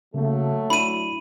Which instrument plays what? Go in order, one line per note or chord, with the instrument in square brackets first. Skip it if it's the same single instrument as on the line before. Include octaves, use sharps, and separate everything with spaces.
[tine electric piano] C#3 A#3 [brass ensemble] F#3 A3
[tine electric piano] D4 E4 [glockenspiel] B5 D#7